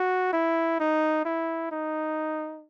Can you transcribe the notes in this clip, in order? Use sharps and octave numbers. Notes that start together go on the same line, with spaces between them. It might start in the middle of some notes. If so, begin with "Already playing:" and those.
Already playing: F#4
E4
D#4
E4
D#4